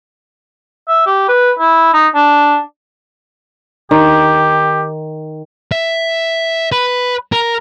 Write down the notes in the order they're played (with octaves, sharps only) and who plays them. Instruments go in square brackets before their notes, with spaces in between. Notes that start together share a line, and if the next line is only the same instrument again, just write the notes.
[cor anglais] E5
G4
B4
E4
D#4
D4
[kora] D#3 [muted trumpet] G4
[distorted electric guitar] E5
B4
A#4